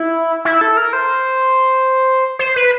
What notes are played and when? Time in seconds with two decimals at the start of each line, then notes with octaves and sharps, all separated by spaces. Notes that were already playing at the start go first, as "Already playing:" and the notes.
Already playing: E4
0.45 E4
0.61 A4
0.77 A#4
0.93 C5
2.39 C5
2.56 B4